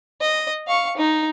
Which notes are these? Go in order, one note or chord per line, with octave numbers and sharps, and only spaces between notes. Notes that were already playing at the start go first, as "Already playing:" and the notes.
D#5
F5 C#6
D#4